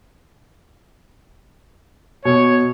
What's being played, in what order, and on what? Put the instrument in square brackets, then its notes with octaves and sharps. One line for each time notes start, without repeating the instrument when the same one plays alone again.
[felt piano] B2 [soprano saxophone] C#5